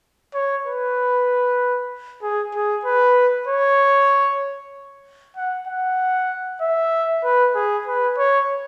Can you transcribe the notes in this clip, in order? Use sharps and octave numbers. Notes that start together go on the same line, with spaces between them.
C#5
B4
G#4
G#4
B4
C#5
F#5
F#5
E5
B4
G#4
B4
C#5